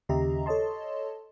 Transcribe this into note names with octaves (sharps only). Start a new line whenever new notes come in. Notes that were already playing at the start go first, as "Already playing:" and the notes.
D#2 C#3 G4 D#5 E5 A#5
A4 C#5 D#5 A5 C6